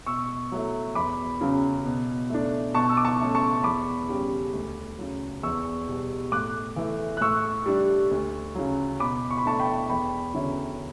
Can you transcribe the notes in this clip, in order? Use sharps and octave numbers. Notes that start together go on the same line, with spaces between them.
B2 C#6 E6
F#3 A3 E4
E2 B5 D6
C#3 F#3 C#4
B2
A3 D4
B2 A5 C#6
E6
D6
A5 C#6
A3 C#4 E4
A5 C#6
E2 B5 D6
C#3 G3 C#4
D2
C#3 F#3
E2 C#6 E6
B2 G3
A2 D6 F#6
E3 A3
F#6
A2 C#6 E6
G3 D4
D2
C#3 F#3
B2 B5 D6
C#6
B5
A3 D4 A5 C#6
G5 B5
E2 G5 B5
D3 F#3 C#4 E4